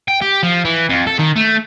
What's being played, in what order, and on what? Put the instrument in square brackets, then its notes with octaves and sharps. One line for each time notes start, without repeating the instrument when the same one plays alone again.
[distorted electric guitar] G5
G4
F3
E3
F2
A4
D#3
A3